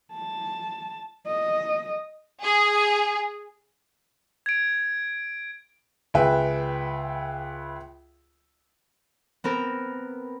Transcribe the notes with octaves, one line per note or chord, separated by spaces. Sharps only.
A5
D#5
G#4
G#6 D7
C#2 G#4 B4 E5 G5
B3 C4 A#4